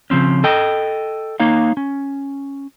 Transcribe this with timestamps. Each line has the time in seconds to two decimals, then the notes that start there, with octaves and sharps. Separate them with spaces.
0.10 C#3 F3 C4 C#4
0.44 A4 D#5 G5
1.40 A#3 D#4 C#5 F5
1.77 C#4